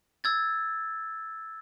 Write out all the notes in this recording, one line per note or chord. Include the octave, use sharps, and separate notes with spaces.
E6 G#6 A6